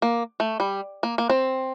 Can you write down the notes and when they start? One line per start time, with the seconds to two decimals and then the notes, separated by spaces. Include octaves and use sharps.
0.02 A#3
0.40 A3
0.60 G3
1.03 A#3
1.18 A#3
1.29 C4